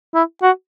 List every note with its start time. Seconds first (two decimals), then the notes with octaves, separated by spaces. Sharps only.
0.14 E4
0.42 F#4